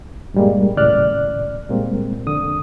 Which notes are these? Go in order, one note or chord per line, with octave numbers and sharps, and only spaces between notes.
G2 A#2 G3 G#3 A#3
D#2 A2 C#3 D5 F6 F#6
A#2 G3 G#3 A#3 C4
F2 D3 D#6